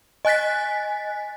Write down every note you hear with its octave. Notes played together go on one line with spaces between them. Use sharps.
D#5 G#5 F#6 A6 B6